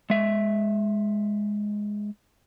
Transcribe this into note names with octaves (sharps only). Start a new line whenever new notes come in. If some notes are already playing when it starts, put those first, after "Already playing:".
G#3 E5